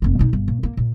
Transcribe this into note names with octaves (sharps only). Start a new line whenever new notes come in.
F1 A#3
B2 D#4
G1
A#2
A#3
A#2